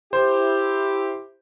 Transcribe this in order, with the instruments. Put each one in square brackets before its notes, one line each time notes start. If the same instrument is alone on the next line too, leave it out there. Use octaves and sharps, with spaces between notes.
[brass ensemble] E4 G4 [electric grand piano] C5